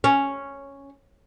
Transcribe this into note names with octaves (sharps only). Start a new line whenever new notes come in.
C#4